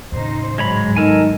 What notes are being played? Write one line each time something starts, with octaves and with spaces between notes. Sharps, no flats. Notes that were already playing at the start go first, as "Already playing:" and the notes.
D#2 A2 C#3 D#4 C5
G#2 F#3 G#3 C#5 B5
D#3 G3 B3 D#4 A4 A#4 G#5